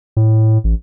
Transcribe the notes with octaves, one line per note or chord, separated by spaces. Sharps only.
A2
A1